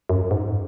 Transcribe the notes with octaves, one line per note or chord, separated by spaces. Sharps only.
F#2
G#2